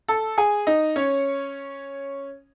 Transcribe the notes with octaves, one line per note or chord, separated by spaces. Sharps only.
A4 A5
G#4 G#5
D#4 D#5
C#4 C#5